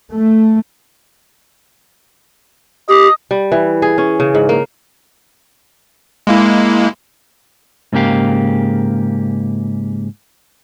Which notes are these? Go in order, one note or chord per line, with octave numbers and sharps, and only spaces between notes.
A3
G4 D#5
G3
E3
G#4
C#4
C#3
G#2
A#3
G#3 A#3 E4
G#2 C#3 A#3 G4 F5